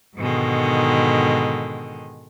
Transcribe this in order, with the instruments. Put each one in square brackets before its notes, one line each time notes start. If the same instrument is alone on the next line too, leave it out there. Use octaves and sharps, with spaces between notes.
[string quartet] G#2 B2 D3 D#3 G#3